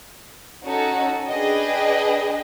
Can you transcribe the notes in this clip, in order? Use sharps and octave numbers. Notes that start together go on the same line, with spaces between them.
C#4 D#4 F#4 A4
D4 G#4 B4 D#5 G5